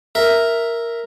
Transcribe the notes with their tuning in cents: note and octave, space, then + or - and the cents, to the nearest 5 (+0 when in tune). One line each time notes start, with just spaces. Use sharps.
A#4 +0 E5 +0